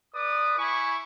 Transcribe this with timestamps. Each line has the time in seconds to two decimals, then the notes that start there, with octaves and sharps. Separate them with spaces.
0.14 B4 D5 D#6
0.58 E4 G#5 B5 C#6